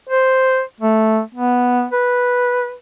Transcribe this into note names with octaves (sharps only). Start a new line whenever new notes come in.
C5
A3
B3
B4